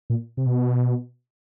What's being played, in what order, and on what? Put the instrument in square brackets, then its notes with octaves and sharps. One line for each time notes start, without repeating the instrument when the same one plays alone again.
[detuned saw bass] A#2
C3
B2